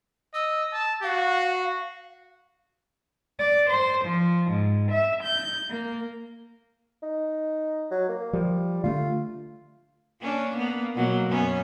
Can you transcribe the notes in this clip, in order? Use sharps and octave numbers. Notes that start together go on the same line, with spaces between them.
D#5 E6
A5
F#4 F5
D5
C5
F3
G#2
E5
G6
A#3
D#4
F#3
A#3
F3 G3
D3 A3 D4 F4
A#3 C#4 D4
A#3 B3
B2 F#3 A#3
F#2 B3 C#4